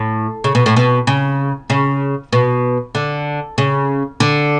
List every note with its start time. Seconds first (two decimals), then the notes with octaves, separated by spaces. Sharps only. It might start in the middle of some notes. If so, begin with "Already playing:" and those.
Already playing: A2
0.44 C#3
0.55 B2
0.66 A2
0.76 B2
1.07 C#3
1.70 C#3
2.33 B2
2.95 D3
3.58 C#3
4.20 D3